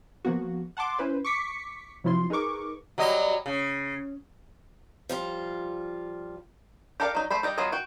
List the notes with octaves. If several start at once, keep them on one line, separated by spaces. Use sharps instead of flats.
F3 A#3 B3 F#4
F#5 A5 C6 D6
C#4 E4 B4 C5
C#6 D6 B6 C#7
C3 F3 F#3 E4 F4 C6
D#4 G#4 A#4 B4 C#6 D6
F#3 G3 D#5
C#3
F3 G3 F4
G4 A4 A#4 D5 F5
F#3 D#4
A3 A4 C5 B5
G3 G4 D#5
F#3 B3 F4 G#4 D#5
F#4 G5